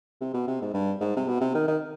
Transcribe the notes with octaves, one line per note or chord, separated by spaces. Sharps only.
C3
B2
C3
G#2
G2
G#2
C3
B2
C3
D#3
D#3